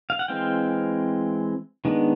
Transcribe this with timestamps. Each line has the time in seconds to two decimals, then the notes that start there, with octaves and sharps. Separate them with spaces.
0.10 F5
0.19 F#5
0.28 E3 G#3 C4 F5 G5
1.85 D#3 G#3 B3 D4